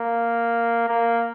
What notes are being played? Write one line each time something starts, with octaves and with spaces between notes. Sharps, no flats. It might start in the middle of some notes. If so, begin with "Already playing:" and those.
Already playing: A#3
A#3